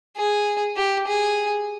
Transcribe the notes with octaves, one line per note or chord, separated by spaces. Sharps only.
G#4
G4
G#4